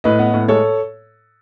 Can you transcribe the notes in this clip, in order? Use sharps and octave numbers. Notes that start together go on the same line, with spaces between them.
A2 B4 D#5
B3
A2
G#3 A4 C#5